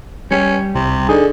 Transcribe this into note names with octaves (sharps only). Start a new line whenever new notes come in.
G3 C#4 G4
C2 C3
D3 D#4 G#4